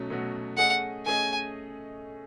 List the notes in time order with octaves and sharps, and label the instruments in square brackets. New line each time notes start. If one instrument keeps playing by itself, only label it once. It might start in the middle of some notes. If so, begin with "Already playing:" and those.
Already playing: [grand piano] B2 F#3 A3 C#4 F#4
B2 F#3 A3 C#4 F#4
[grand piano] A3 C#4 G#4 D#5 [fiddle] F#5
[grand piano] A3 C#4 G#4 D#5 [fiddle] G#5